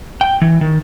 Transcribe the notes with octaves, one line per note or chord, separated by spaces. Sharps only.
G5
E3
D#3